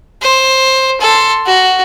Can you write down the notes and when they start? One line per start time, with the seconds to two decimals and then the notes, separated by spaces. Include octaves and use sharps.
0.22 C5
1.01 A4 C6
1.46 F#4